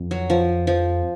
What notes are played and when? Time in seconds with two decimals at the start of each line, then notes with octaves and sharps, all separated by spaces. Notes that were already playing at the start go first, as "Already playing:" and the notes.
Already playing: F2
0.11 F#3
0.30 F3
0.67 F3